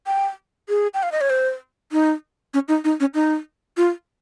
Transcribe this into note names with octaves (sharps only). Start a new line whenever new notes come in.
G5
G#4
G5
F5
D#5
C#5
C5
D#4
C#4
D#4
D#4
C#4
D#4
F4